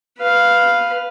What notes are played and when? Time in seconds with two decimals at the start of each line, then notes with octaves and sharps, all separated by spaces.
0.18 B4 F5